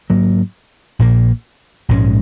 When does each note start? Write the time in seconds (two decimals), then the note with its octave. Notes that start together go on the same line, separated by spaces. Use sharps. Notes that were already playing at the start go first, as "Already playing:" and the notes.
0.10 G#2 F#3 A#3
0.99 A#1 A#2 A#3
1.89 A#1 G#2 G#3 C#4